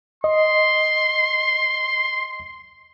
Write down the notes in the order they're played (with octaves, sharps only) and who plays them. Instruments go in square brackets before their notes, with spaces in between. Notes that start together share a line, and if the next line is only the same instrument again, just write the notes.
[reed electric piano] D#5 [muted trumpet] C6